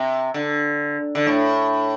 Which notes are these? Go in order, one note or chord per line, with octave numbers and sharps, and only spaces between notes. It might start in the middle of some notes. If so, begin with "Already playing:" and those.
Already playing: C3
D3
D3
A2